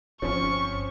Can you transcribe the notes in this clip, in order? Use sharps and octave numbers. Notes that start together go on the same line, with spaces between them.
G1 F3 C4 C#4 C#6